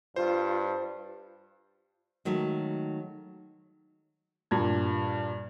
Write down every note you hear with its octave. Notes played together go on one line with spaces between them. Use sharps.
G2 F4 C5
D#3 F#3 G#3 A3
G2 A#2 G#6